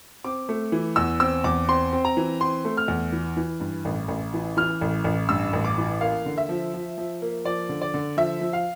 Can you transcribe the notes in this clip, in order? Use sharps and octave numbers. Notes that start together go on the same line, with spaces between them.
C4 D6
A3
E3
E2 E6
C4 E6
E2 D6
C4 C6
C4
A#5
E3
C4 C6
A3
F6
E2
E3
E3
G2
A1
A1
E3
E3 F6
A1
A1
G2 E6
A1
D6
E3
A#3 F5
D3
E5
F3
F3
F3
A#3
F3 D5
D3
D5
D3
F3 E5
F3
F5